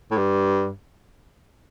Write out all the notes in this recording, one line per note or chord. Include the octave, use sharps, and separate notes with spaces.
A2
G2